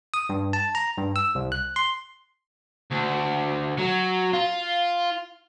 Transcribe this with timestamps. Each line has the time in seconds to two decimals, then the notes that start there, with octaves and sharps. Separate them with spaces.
0.14 D#6
0.29 G2
0.53 A5
0.75 A#5
0.97 G2
1.16 E6
1.35 C2
1.52 F#6
1.76 C6
2.91 D2
3.78 F#3
4.33 F4